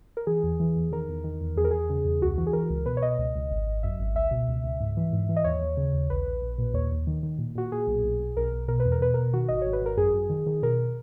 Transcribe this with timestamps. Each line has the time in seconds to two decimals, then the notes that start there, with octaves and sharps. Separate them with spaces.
0.17 A#4
0.27 E3 G#4
0.43 E2
0.60 E3
0.76 E2
0.92 D#3 A#4
1.09 E2
1.24 D#3
1.41 E2
1.56 E2 G#4
1.65 A#4
1.71 E2 G#4
1.90 C#3
2.05 E2
2.22 C#2 F#4
2.38 E3 F#4
2.47 G#4
2.53 E3 A#4
2.70 C#2
2.86 B2 B4
2.97 C#5
3.02 B2 D#5
3.18 C#2
3.35 C#2
3.51 G#1
3.67 G#1
3.83 F#2 E5
4.00 G#1
4.15 C#2 E5
4.31 B2
4.48 C#2
4.64 C#2
4.80 G#2
4.97 E3
5.13 G#2
5.29 E3
5.36 D#5
5.44 D#2 C#5
5.61 D#2
5.77 C#3
5.93 D#2
6.10 A#1 B4
6.26 A#1
6.42 A#1
6.58 A#2
6.74 D#2 C#5
6.91 D#2
7.07 D#3
7.23 D#3
7.39 A#2
7.55 A#2 F#4
7.72 A#2 G#4
7.87 B1
8.04 B1
8.20 B1
8.37 B1 A#4
8.52 B1
8.68 B2 A#4
8.80 B4
8.85 E2
8.92 A#4
9.01 B2 B4
9.14 B2 A#4
9.33 D#3 F#4
9.48 G#1 D#5
9.62 G#1 C#5
9.73 B4
9.81 G#1 A#4
9.97 F#2 G#4
10.14 F#2
10.30 D#3
10.46 D#3
10.62 B2 A#4